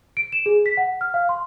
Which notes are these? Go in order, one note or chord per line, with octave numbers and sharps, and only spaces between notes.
D7
E7
G#4
B6
F#5
F6
F5
C6